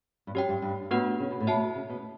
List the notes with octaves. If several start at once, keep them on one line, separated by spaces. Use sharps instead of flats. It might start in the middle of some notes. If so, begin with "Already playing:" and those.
G2
F#2 G4 C#5 G5
G2
G2
A2 B3 D4 F#4 B4 F#5
C#3
B2
A2
B2 F#4 C#5 E5 A5
C#3
B2